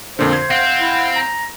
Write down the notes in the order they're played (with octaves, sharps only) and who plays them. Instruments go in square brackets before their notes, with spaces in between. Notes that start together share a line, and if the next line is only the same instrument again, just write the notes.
[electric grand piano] F2 A#2 D3 [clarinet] C5
[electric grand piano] G#6
[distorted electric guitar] C4 [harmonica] F5 F#5
[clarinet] E4
A#5